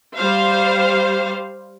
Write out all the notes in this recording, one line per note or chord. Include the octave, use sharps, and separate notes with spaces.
G3 C5 F5